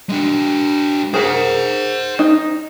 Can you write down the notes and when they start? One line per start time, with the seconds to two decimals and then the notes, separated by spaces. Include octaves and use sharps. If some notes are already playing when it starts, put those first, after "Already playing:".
0.09 G#3 D4
1.14 G#4 A#4 C5 F#5
2.19 D#4